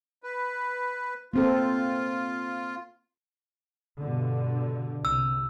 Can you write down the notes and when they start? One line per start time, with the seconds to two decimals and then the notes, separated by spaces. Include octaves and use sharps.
0.23 B4
1.33 A#3 C4 F4 A4
3.99 G2 B2 D3
5.05 C2 E6